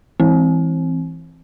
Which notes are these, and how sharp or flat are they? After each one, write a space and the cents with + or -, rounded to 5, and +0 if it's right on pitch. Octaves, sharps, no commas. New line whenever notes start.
E3 +0 C4 +0